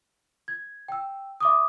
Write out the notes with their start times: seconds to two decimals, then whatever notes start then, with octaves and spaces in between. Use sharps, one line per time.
0.48 G#6
0.88 G5 E6
1.40 E5 D6 D#6